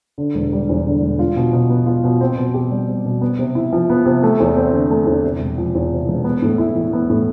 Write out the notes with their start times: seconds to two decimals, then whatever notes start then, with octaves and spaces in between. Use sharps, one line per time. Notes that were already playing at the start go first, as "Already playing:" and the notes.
0.18 D3
0.35 E1
0.53 G3
0.69 E2
0.85 D3
1.02 E1
1.19 F4
1.36 B2
1.53 B2
1.70 B3
1.86 F4
2.04 B2
2.21 C4
2.38 B2
2.54 G4
2.70 G3
2.88 C4
3.05 B2
3.21 B3
3.39 C3
3.55 E4
3.73 F3
3.90 B3
4.06 C3
4.23 A3
4.40 E2
4.57 C4
4.74 D3
4.91 A3
5.06 E2
5.24 C3
5.40 E1
5.58 F3
5.75 E2
5.92 C3
6.08 E1
6.24 B3
6.42 A2
6.58 E4
6.75 E3
6.93 B3
7.10 A2